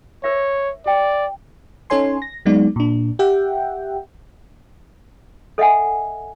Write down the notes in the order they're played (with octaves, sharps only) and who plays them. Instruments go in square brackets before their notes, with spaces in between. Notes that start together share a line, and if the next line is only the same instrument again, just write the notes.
[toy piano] A#4 C5 E5 [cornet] C#5
[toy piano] G4 G5 [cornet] D5
[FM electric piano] C#4 D#4 A4 C#5 G#5 C6
A#6
F#3 G#3 B3 D#4 D5
A#2 D4
G4 E5 F#5 G5
[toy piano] A4 D#5 E5 F#5 G#5